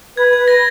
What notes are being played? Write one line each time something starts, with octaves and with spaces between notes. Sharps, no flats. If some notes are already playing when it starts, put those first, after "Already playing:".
B4 G#6
B4 G#6
A#6